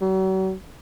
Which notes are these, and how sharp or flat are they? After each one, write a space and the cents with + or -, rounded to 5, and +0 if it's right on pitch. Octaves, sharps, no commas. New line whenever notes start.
F#3 +40